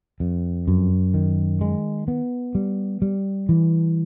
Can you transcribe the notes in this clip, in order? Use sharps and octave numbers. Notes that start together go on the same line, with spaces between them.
F2
F#2
D#3
G#3
B3
G3
G3
E3